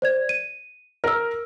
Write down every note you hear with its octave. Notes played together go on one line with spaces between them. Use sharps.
C5 D5 G#6
D#7
A#4 E6 F6